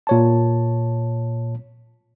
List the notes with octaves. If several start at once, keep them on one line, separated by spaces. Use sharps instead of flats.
A#2 C#5 A5